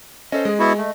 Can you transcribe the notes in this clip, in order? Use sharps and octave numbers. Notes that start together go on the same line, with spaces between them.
C#4 A4 C5 D#5
G#3 G#4
B3 E4 F#4
A3